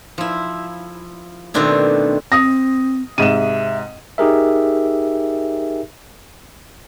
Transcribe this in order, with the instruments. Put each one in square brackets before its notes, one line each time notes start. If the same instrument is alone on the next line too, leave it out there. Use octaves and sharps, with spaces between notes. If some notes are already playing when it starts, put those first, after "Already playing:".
[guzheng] F3 E4
B2 D#3 A3 C4 D4 E4
[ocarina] C4 [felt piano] D#6 A#6
[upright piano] G#2 C3 [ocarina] E5 [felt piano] D#7 E7
[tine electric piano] D#4 G4 G#4 A#4 E5